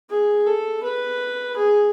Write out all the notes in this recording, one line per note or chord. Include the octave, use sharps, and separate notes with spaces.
G#4
A4
B4
G#4